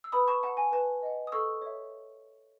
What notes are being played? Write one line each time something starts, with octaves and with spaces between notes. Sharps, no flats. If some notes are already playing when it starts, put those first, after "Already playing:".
E6
B4 B5 D#6
A5 C#6
F#5 A5
G#5
B4 A5
D#5 F#5
D#6
A4 C#6 E6
C#5 E5